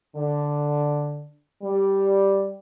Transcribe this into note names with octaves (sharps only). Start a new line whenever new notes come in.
D3
G3